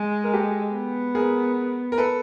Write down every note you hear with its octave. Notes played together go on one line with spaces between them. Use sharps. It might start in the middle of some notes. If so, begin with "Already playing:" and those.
Already playing: G#3
A#4
G4 A4
B3
G#4 A#4
A#4
A4 B4